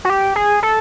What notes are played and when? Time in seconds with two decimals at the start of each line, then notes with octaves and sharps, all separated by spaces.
0.05 F#4
0.10 G4
0.36 G#4
0.63 A4